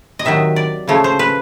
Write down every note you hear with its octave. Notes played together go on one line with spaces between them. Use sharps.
D#5
C3 D#3 F#3 E5
D5
C#3 F3 A3 C#5
C5
B4